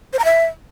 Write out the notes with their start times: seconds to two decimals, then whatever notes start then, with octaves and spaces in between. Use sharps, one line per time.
0.13 C5
0.19 A#5
0.25 E5